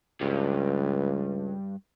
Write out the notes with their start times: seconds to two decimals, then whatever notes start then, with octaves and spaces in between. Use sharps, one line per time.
0.21 C#2 G2